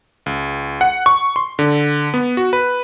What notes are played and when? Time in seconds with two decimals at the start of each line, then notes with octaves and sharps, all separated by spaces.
0.26 C#2
0.81 F#5
1.06 C#6
1.36 C6
1.59 D3
2.14 B3
2.37 F#4
2.53 B4